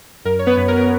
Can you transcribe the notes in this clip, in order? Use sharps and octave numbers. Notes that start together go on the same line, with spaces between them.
F#2 A#4
C#5
B3 B4
F#2
A#4